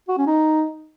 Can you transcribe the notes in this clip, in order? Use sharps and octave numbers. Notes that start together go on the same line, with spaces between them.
F#4
C#4
D#4